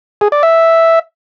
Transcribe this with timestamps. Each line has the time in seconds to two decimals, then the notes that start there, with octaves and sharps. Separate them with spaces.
0.21 G#4
0.32 D5
0.43 E5